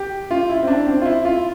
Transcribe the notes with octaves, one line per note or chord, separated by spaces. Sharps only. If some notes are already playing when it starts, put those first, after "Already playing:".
Already playing: G4
F4
E4
C4
D4
C4
F4
E4
F4